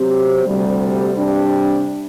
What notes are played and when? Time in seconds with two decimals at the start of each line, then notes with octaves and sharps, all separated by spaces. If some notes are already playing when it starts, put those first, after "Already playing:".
Already playing: C3 F#3 C4 G4
0.46 D2 C3 G3
1.16 C3 G3 D4